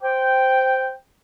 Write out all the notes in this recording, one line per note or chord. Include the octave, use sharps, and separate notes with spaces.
C5 G5